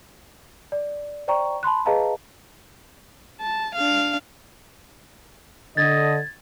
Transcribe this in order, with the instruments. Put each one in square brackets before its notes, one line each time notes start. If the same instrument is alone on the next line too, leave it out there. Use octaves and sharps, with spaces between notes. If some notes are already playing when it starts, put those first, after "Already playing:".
[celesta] D5
C5 D5 G5 A#5 C#6
A5 B5 C6 F#6
G#4 B4 D#5 F5 A5 A#5
[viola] A5
D4 F5
[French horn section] D3 [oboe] D#5 [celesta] G#6 A6